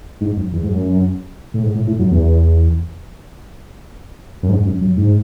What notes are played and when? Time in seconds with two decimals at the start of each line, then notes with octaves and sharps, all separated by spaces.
0.21 G#2
0.36 F#2
0.52 E2
0.63 G#2
0.69 F#2
1.54 A2
1.63 G#2
1.75 A2
1.87 A2
1.99 F#2
2.11 E2
4.43 F#2
4.49 G#2
4.66 F#2
4.81 F#2
4.97 G#2